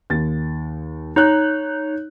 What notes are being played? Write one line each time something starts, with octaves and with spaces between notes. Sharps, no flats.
D#2 A6
D#4 C#5 F#6